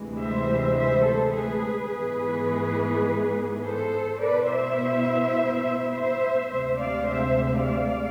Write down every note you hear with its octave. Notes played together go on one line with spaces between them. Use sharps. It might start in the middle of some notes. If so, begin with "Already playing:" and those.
Already playing: D2 C3 E3 G#3
C5 E5
C5 E5
A4 C5
G#4 B4
G#2 E3 G#3 B3 G#4 B4
A4 C5
B2 B3 E4 B4 D5
C5 E5
C5 E5
D2 C3 G#3 C5 E5
D5 F5
C5 E5
D5 F5